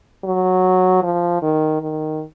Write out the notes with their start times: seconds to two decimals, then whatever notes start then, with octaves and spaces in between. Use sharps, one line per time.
0.24 F#3
1.03 F3
1.42 D#3
1.81 D#3